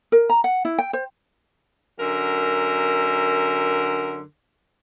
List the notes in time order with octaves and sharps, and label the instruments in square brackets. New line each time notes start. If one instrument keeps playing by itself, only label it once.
[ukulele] A#4
A#5
F#5
E4
G5
C5
[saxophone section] F#2 D3 A#4